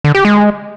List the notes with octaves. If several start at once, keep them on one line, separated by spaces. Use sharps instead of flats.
D3
G4
G#3